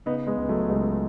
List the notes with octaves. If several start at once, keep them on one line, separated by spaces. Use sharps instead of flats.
C#3 B3 D#4
G#3 B3
C#2
F#3 A3
C#2 G#3